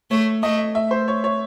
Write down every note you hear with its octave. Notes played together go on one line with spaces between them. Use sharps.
A3 C#5
A3 D#5
E5
C5
C#5
C#5